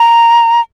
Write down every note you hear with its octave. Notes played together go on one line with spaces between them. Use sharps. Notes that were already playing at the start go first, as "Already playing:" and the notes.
Already playing: A#5